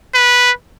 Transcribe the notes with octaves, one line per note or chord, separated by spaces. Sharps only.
B4